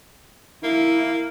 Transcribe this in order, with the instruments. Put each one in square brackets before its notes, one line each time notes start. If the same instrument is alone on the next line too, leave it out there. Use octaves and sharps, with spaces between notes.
[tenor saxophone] A#3 [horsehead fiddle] E4